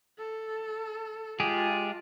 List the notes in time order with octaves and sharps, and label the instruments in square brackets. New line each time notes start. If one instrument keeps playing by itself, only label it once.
[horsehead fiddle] A4
[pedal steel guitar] G#3 G4 G#4 [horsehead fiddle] F4 A5